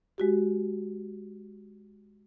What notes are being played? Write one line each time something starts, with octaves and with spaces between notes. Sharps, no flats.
G#3 F#4 G4